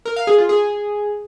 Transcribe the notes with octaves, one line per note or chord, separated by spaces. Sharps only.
A#4
F5
G#4
F4
G#4